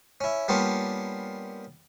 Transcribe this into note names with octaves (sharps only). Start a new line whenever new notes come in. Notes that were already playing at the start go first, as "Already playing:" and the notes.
C#4 E4
G3 A#3 B3 C#4 D4 F4